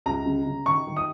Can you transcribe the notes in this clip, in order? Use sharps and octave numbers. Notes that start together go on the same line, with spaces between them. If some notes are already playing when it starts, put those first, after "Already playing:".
C#2 A#5
C#3
C#3
D#3 C#6
D#3
D#6